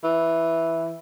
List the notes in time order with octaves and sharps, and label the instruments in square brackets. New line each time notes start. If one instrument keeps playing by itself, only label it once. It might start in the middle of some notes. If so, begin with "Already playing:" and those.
[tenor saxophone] E3